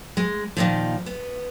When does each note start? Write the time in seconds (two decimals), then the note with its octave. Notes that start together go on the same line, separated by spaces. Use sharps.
0.17 G#3
0.57 A#2 D#3 F3
1.06 B3